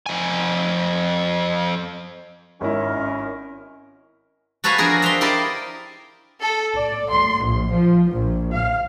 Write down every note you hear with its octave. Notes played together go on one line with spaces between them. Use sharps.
F2 G#5
G#1 C#4 E4 A#4
F#4 A4 B4 C#5 F5 G#5
F3 D4 F#4 G#4 A#4
E5 F5 G5 C6
E4 G4 A#4 D5 D#5
A4
D5
C6
A#1
F3
A#1
F5